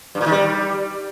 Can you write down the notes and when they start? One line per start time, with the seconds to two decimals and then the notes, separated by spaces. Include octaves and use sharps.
0.15 G2
0.21 A#2
0.26 D#3
0.32 G3